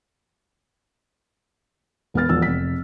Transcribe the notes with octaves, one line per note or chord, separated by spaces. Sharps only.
E1 B3 B4 F6 A6
E1 F3 E6
F1 B6